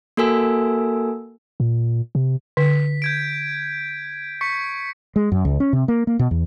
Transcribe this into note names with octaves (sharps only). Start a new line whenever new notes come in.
A#3 F#4 A4 A#4 G#5 E6
A#2
C3
D3 B6
G6 G#6 D7
C#6 B6 C#7
G#3
F#2
C#2
C#4
C3
A#3
A#3
B2
E2